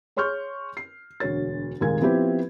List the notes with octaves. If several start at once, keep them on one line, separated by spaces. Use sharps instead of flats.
G#4 C#5 C6 C#6 F6 G6
C7
E1 D2 F#4 C#5 A6
F1 D#2 A#2 G#3 A#4 G#6
F3 B3 C4 E4 G4 C5